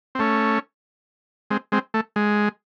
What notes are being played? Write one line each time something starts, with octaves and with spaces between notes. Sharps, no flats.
C4
A3 C#4
G#3 C4
G#3 C4
A3
G#3